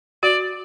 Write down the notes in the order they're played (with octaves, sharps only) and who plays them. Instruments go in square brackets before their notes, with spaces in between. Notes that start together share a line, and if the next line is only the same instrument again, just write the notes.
[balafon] F#4 [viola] D5